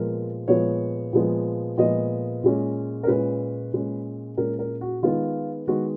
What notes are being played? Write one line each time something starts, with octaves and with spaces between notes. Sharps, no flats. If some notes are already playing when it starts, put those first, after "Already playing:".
Already playing: A#2 F3 G#3 B3 A#4
A#2 F3 G#3 B3 C#5
A#2 F3 G#3 B3
A#2 F3 G#3 B3 D#5
A#2 G#3 C#4
A#4
A#2 G#3 C#4 B4
A#2 G#3 C#4
A#2 G#3 C#4 A#4
A#4
F#4
D#3 G#3 B3 F4
D#3 G#3 B3 F#4